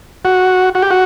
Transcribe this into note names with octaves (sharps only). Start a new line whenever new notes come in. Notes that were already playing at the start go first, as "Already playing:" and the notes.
F#4
F#4
G4
F#4